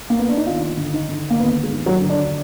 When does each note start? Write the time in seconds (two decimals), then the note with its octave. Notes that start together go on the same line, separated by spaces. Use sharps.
0.10 A#3
0.19 B3
0.29 D4
0.37 D#4
0.47 D#2 F4
0.77 D3
0.93 D#4
1.09 D3
1.30 A#3
1.39 D#2 B3
1.63 G#3
1.71 D#2
1.86 F#3
2.01 D3
2.09 D4